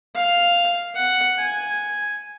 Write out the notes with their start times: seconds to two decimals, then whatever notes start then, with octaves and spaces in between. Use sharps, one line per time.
0.15 F5
0.95 F#5
1.38 G#5